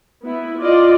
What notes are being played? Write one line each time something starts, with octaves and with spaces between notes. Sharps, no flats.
B3 E4
F4 D5 D#5